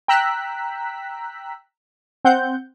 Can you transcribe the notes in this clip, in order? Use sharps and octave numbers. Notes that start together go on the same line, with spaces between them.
G5 A#5 E6 F#6 B6
C4 F#5 G6